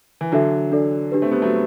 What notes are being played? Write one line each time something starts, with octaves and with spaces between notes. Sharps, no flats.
E3
D3 F#3 D4 A4 E5
D4 A4 D5
D4 G4 B4
A3 C4
G3 B3
F#3 A3